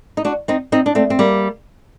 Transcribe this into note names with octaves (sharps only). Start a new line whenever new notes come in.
D#4
D4 F#4
C4 D#4
C4 D#4
D4
A3 C4
C4
G3 A#3